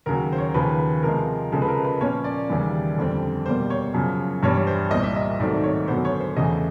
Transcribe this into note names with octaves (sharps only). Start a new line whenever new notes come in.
D#2 C#3 F#3 A#4
C5
C#5
D#2 C#3 F3 B4
B4
C3 F3 G#3 A#4
C#3 F3 G#3 A4
B4
A#4
B4
A#2 F3 A#3 C#4 C#5
D5
D#2 C#3 E3 G3
F2 D3 G3 C4
B2 G3 A#3 C5
C#5
F#2 C#3 F3
G2 E3 G3 C#5
C#5
C5
C2 A#2 G3 D#5
E5
D#5
G#2 D#3 F#3 A3 C4 D5
C#5
F#2 D3 F#3 B3 C5
C#5
C5
E2 C#3 E3 A3 D#5